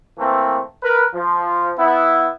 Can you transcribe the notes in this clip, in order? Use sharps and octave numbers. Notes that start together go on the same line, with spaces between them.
E3 A3 A#3 C4
A#4 B4
F3
B3 E4